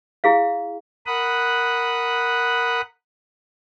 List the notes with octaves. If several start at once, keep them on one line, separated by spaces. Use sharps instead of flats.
E4 G#4 F5
A#4 F#5 B5 D#6 F#6